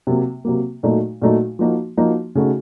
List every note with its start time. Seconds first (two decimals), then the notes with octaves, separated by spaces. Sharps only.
0.07 C3 F#3 A#3
0.45 C3 F#3 A#3
0.83 A#2 F#3 A3 D#4 F#4
1.22 A#2 F#3 A3 D#4 F#4
1.59 F3 A#3 D#4 F#4
1.97 F3 A#3 D#4 F#4
2.35 C#3 A3 D#4 F#4